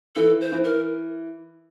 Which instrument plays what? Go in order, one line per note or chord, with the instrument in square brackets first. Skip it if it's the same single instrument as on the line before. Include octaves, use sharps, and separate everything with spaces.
[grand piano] E3 [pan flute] A4
[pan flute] C5
[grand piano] E3
[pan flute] A#4